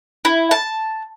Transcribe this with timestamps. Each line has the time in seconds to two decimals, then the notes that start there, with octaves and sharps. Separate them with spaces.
0.25 E4
0.51 A5